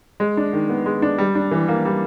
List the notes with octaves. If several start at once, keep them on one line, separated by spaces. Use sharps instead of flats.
G#3
D4
D#3
B3
G#3
D4
G3
D4
E3
A#3
G3